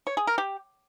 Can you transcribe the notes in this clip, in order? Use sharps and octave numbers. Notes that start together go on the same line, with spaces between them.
C#5
G#4
A#4
G4